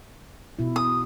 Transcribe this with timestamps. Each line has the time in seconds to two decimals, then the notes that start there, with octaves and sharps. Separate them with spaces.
0.59 B2 E4
0.76 D#6